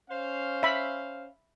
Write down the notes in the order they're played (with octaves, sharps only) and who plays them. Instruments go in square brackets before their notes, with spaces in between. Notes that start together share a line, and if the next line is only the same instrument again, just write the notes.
[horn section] C#4 C5 F5
[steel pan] E5 B5